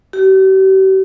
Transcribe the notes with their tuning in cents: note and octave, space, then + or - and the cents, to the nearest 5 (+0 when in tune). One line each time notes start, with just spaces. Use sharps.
G4 -45